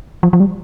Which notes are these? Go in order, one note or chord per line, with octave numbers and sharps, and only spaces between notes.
F3
F3
G3